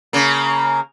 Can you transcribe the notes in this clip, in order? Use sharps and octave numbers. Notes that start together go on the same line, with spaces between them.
C#3 A#3